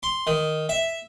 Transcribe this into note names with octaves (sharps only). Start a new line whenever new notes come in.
C6
D#3
E5